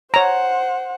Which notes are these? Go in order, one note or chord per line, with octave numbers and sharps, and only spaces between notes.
C5 C#5 F#5 A#5